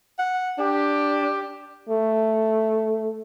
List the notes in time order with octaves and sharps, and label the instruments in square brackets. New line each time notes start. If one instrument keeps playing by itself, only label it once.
[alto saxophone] F#5
[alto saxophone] D4 [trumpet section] G4
[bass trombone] A3